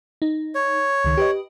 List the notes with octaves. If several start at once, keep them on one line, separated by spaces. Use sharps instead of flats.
D#4
C#5
C#2 D#3
G4 B4 D#5